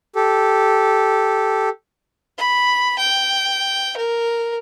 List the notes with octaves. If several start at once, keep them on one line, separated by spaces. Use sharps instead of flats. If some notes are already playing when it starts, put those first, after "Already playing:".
G4 A4
B5
G5
A#4